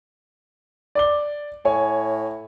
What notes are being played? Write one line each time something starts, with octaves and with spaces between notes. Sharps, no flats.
D5 D6 G7
A2 C#5 G#5